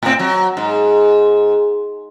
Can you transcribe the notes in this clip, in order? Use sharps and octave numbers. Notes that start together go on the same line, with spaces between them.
A2 C4
F#3
G#2